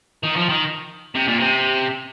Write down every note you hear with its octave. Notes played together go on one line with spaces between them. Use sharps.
D#3
F3
D#3
C3
A#2
C3